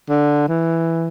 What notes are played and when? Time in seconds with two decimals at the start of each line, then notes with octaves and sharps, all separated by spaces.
0.09 D3
0.48 E3